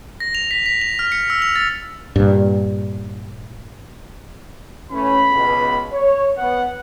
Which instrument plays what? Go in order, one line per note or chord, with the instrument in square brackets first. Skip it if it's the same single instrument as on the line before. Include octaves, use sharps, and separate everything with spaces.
[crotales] A#6
F7
B6
B6
F7
F6
C#7
E6
F7
A6
[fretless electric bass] G2 A#2
[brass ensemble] E3 A3 C#4 [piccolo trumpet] B5
[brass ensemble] C#2 B2
C#5
[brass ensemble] B3 [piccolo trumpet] F#5